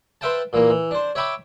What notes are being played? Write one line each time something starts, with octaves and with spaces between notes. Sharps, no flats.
B4 C5 E5 F5 G5 A5
A#2 E3 A#3
E3
D4 C5
C#5 E5 G5 B5 C#6 D6